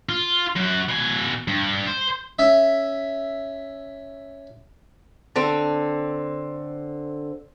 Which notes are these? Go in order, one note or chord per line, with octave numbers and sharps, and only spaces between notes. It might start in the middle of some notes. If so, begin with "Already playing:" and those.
F4
F#2 F#4
B2 G#5
G2
C5
C#4 E5
D3 C4